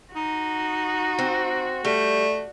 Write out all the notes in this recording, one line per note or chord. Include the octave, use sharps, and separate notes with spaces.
D#4 F#4
C4
G3 A3